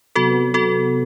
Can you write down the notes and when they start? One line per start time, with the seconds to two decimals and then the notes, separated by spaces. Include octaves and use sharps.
0.15 C3 F#3 B3 F#4 A4
0.54 F#4 A4